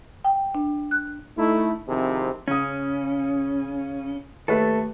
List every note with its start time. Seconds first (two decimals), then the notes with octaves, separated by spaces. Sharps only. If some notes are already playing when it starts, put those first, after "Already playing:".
0.24 G5
0.55 D4
0.91 F#6
1.38 A3 D#4 E4
1.88 C3 D#3 F3 C4 E4 G#4
2.48 C#3 C#4 D#6
4.48 D#2 A3 A4 B4